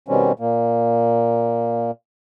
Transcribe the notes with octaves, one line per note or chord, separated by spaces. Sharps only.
B2 D#3 G3 C4 C#4
A#2 A#3